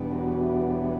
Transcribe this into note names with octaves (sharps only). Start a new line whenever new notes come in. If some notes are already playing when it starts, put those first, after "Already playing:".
Already playing: E2 B2 G3 B3 D4
D3 F#3
E3
F#3
E3